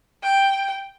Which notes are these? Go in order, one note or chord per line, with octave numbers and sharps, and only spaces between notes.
G5